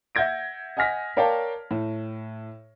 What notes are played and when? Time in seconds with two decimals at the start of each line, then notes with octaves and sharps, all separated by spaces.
0.15 E5 F#5 G6 G#6 A#6 D7
0.77 D#5 F#5 G#5 F6 A#6 B6
1.17 A#4 C#5 D5 F5 G5 A5
1.71 A2